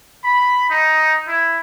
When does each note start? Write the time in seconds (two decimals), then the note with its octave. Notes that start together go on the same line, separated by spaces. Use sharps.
0.24 B5
0.70 D#4
1.28 E4